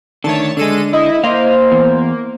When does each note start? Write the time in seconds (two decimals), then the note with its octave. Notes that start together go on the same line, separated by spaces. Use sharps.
0.24 D3 D#3 A3 C#5 A5
0.57 D3 G#3 A4 D#7
0.93 E4 D#5
1.24 A#3 C5 D#5 F5
1.72 E2